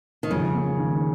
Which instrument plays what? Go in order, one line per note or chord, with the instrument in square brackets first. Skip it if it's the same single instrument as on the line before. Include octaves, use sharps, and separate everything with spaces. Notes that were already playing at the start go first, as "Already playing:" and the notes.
[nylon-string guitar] D#3
[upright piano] F2 [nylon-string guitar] C#3
[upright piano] A#3
D#3